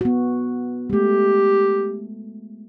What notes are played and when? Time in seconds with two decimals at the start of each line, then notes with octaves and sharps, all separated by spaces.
0.01 B3 F#4
0.90 G#3 A3 G4